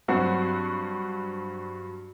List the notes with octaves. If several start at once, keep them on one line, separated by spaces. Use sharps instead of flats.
G2 F#3 C4 F#4